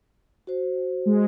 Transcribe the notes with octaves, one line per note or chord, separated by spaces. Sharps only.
F#4 C5
G#3